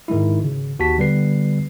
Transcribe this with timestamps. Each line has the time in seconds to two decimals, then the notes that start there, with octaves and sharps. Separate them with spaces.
0.08 G#2 D#3 G#3 E4
0.39 G#1 C#3
0.79 D#2 F#4 G4 A5 B6
0.98 D3 G3 B3 B4 C7